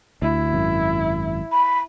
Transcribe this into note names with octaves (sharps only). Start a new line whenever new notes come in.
D2 E4
G#1 F#2
B5